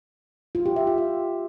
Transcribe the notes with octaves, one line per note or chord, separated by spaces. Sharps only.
F4
G4
E5
F4
F5